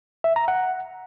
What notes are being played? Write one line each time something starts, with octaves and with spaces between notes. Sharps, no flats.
E5
A#5
F#5